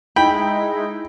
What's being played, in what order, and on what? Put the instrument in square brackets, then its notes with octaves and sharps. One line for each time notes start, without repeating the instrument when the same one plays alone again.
[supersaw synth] G#3 D#4 E4 [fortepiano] G5 [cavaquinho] B5